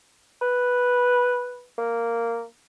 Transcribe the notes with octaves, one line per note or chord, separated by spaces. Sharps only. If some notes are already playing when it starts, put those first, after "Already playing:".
B4
A#3